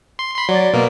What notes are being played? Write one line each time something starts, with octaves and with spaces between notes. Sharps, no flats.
C6
B5 C6
F#3 D5
B2 A#3